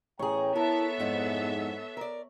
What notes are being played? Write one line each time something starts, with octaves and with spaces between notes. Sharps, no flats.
A1 A2 G#4 C#5 G5 A#5
B3 E4 A4 A#4 E5 A5
F2 G#2 E4 F#5
A#4 D5